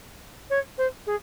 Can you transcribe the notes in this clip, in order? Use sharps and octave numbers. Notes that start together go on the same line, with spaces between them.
C#5
C5
G#4